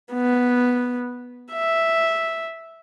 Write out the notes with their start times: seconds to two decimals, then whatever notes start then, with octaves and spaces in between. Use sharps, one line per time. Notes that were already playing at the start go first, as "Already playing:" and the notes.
0.13 B3
1.53 E5